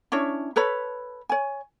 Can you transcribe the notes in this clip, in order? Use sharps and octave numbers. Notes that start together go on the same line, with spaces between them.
C#4 D4 E4 C#5
A4 B4 C#5 B5
C#5 G#5